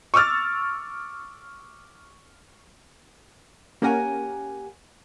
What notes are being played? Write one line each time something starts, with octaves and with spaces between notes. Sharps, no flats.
C#6 D6 E6 F6 A6
A#3 C#4 G4 A#4 F#5 G#5